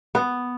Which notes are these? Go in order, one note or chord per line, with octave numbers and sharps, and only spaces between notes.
B3